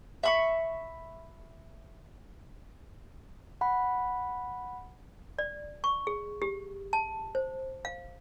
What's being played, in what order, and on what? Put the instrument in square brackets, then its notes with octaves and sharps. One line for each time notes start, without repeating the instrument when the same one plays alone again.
[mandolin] E5 B5 C#6
[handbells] F#5 B5
[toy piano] D5
C#6
G#4
G4
A5
C5
F5